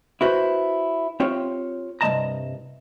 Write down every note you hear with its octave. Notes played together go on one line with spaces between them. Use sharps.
E4 F#4 B4 C5
C4 F4 G4 C#5
C2 G2 F3 D#5 A5 A#5